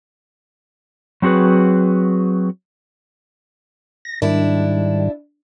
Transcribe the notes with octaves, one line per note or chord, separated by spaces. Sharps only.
F#3 C4 F#4 G#4 B4
A#6
G#2 D#3 G3 D4 E4